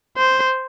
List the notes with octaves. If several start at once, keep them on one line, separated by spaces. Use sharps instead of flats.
C5